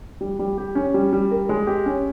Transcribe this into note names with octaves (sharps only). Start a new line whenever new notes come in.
G3
G3
G4
C#4
G3
G3
A#4
G#3
G4
C#4